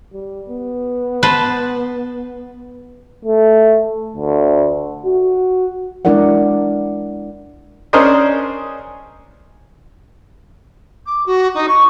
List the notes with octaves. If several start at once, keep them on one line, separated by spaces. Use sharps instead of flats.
G3
B3
B4 C5 A5
A3
D2
F#4
G#3 D4 E4 A#4 D5 F#5
C#4 D4 G#4 A#4 C5 D#5
D6
F#4
D#4
C#6